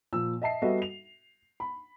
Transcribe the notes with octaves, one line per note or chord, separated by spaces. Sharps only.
A#2 F3 E6
D#5 E5 A5 C7
G3 B3 F#4 A4 D#5 E5
F7
B5